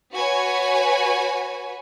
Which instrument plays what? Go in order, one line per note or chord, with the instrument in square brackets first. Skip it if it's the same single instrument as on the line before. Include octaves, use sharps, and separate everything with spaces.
[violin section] F#4 B4 C#5 G#5